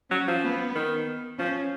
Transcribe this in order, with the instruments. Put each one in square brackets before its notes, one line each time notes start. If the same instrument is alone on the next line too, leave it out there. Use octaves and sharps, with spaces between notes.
[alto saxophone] F#3 [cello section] C#4
[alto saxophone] F3
[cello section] B3
[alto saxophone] D#3
[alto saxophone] F3 [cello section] C#4